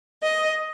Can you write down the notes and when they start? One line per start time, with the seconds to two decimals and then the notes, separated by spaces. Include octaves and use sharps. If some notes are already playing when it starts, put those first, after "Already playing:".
0.22 D#5